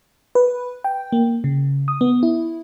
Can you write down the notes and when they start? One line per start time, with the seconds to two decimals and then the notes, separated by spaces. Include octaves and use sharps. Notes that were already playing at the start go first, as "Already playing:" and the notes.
0.35 B4
0.84 G5
1.12 A#3
1.44 C#3
1.88 D#6
2.01 B3
2.23 E4